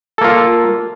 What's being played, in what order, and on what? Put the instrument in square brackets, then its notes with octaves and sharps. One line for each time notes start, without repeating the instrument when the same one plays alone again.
[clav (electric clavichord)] A4
A#3
F4